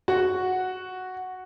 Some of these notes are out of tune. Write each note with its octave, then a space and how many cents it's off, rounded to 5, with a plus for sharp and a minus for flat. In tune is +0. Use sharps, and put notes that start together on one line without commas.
F#4 +0 F#5 -5